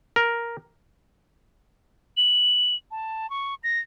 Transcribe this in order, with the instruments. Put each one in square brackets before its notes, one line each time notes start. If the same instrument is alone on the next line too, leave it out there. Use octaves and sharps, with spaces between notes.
[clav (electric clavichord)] A#4
[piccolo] F#7
A5
C#6
A#6